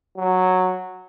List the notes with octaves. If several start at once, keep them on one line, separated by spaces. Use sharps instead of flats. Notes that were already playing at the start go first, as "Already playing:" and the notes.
F#3